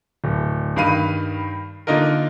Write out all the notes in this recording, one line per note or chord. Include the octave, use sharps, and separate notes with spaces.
D1
G2 D#3 F5 B5 D#7
D3 A#3 D#4 F4 A#4